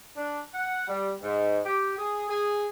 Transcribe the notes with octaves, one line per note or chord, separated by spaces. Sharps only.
D4
F#5
G3
G#2
G4
G#4
G#4